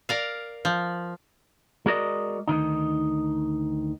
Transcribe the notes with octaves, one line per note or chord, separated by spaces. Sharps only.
A#4 D5 F5
F3
G#3 F#4 A#4 D5 D#5
D2 D#3 D#4